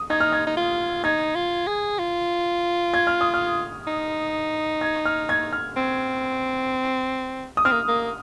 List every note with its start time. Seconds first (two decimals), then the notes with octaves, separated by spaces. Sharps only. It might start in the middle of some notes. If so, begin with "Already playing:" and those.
Already playing: D#6
0.10 D#4 G#6
0.20 F6
0.32 G#6
0.47 D#4
0.57 F4
1.04 D#4 G#6
1.36 F4
1.67 G#4
1.99 F4
2.94 G#6
3.07 F6
3.21 D#6
3.34 F6
3.87 D#4
4.81 G#6
5.05 F6
5.29 G#6
5.53 F6
5.76 C4
7.57 D#6
7.65 C4 F6
7.72 A#3
7.88 A#3